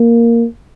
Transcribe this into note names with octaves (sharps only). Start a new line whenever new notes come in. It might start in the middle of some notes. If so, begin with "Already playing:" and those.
Already playing: A#3